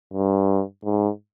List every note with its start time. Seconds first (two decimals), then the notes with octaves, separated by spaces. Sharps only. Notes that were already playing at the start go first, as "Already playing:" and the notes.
0.14 G2
0.85 G#2